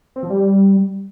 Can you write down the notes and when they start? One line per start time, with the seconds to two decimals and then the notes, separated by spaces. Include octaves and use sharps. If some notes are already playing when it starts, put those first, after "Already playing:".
0.16 C4
0.23 F3
0.30 G3